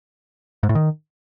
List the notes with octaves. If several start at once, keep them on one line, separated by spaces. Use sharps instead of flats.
G#2
A2
D#3